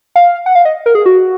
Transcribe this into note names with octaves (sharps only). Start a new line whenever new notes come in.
F5
F#5
F5
D#5
A#4
G#4
F#4